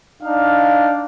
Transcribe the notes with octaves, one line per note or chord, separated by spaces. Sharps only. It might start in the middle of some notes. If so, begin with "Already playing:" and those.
D4 D#4 F5